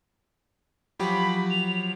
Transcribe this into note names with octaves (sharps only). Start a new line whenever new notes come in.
F3 F#3 G4 B5
F7